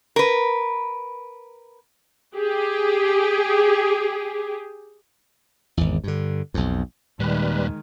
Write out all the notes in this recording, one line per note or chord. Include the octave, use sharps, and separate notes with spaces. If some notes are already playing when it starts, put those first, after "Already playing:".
A#4 B4
G4 G#4
G#1 E2
G2 D3
B1 F2
D#2 A#2 D#3 G3 G#3 B4